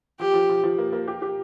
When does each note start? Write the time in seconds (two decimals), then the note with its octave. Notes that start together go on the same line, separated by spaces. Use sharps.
0.20 F3 G4
0.34 F3
0.49 F3
0.63 F3
0.78 A#3
0.93 A#3
1.08 G4
1.22 G4